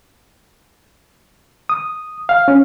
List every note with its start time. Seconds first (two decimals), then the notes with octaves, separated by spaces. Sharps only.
1.69 D#6
2.29 F5
2.48 C#4